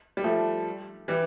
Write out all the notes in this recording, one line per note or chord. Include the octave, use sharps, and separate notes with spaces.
G3
F3 A3
E3 G3